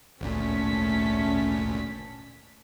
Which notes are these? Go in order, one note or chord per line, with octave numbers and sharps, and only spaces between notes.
G#1 D2 A#2 A3 C#4 A5 B6